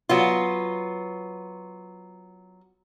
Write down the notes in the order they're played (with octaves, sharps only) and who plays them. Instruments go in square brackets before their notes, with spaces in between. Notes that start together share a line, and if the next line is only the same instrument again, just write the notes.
[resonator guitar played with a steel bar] F#3 B3 F4